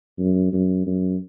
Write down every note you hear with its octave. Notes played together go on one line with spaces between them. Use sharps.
F#2
F#2
F#2